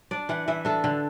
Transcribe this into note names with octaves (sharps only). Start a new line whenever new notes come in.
D4 D5
E3 F#5
E3 E5
D4 A4
D3